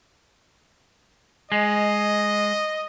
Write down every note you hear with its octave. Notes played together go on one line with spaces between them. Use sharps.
G#3 D#5